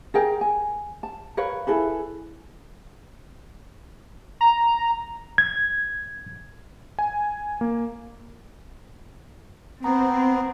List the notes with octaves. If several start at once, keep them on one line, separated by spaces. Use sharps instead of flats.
G#4 A#4 G5
G#5
A5
A#4 B4 C#5 F5
E4 G#4 A4 B4
A#5
G#6
G#5
A#3
B3 C4 A#5